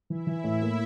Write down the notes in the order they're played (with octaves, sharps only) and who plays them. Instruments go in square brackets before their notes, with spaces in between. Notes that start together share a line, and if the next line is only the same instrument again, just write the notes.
[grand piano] E3 [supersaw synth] E4 E5
[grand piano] E3
A2
A#3